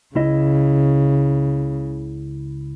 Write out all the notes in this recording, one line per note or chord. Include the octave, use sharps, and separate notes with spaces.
C#2 C#3 E4 D#5